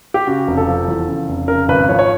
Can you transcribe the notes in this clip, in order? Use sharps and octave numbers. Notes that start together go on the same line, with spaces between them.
G4
C#3 F#4
F1
A4
F3
E2
C#3
F1
C#3 A#4
G#1 B4
F3 C#5
C#5